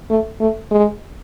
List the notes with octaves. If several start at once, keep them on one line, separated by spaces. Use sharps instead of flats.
A3
A3
G#3